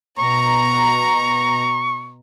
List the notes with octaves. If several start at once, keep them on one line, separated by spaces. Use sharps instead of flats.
B2 A#5 C#6